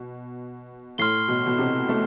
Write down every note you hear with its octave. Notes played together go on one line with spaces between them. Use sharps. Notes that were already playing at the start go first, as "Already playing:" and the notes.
Already playing: B2
A2 C6 F6 C7 G7
B2
B2
C3
A3